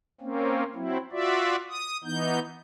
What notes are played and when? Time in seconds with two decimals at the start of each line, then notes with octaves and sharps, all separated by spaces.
0.21 A#3 C4 C#4
0.75 F#3 C4 E4
1.12 F4 F#4 D5 E5
1.69 D#6
2.04 E3 B3 D#4 G6